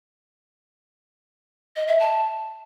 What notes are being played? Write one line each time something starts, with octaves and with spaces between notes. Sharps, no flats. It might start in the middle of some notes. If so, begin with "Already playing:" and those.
D#5
E5
A5